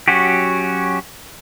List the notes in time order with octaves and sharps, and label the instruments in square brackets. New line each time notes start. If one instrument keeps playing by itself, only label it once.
[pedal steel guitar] F#3 C#4 F#4 G4